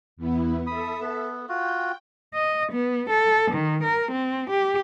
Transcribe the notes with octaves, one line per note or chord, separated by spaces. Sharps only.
E2 B3 E4
A4 E5 B5 D#6
B3
F4 F#4 G5
D#5
B3
A4
D#3
A#4
C4
G4